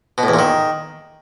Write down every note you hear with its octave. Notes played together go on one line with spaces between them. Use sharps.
B2
A2
E2
A#2
D#3